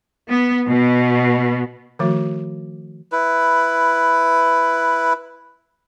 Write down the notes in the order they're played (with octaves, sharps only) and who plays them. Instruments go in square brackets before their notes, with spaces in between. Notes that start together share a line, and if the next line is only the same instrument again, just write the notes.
[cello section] B3
B2
[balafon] D#3 F3 A3 F#4
[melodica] E4 B4